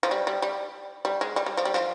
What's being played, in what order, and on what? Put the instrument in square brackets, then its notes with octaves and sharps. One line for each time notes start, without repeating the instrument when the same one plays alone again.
[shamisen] F3
G3
G3
G3
G3
G#3
G3
G3
F3
G3
F3